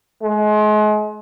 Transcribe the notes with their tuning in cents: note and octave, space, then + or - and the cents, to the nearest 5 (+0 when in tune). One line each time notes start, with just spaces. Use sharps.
G#3 +35